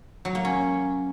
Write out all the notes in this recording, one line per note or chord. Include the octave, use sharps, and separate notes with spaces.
F#3
A#3
C#4